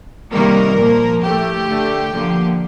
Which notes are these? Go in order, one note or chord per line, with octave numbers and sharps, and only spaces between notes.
C3 D#3 G3 A#3 A#4
A#2 F3 A#3
A2 A3 G4
D3 A3
D3 F3 A#3